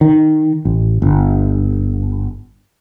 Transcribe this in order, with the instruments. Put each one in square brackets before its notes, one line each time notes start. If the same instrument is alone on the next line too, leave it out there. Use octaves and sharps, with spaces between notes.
[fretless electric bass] D#3
A1
G1